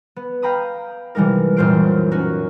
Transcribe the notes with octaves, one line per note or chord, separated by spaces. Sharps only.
B3
F5 G5 A#5 B5 D#6
C3 E3 G3 G#3 D#4 A#4
E1 F#2 A#2 C5 F6 D7
C#4 D#4 F#4 A#4